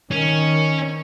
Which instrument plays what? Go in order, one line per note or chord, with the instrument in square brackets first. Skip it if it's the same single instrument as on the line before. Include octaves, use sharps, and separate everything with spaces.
[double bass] D#3 [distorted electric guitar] C#4